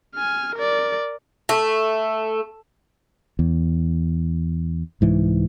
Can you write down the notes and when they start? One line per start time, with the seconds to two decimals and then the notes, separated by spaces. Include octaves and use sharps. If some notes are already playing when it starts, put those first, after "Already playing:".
0.15 G#5 F6
0.55 A#4 D5
1.49 A3
3.39 E2
5.01 C2 G#2 E3